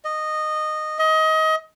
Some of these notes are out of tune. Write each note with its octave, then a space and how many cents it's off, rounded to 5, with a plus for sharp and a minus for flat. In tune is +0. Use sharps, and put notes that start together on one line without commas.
D#5 -15
D#5 +25